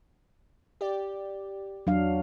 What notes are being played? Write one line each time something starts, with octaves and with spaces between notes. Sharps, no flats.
G4 D5
E2 F#3 D4 F5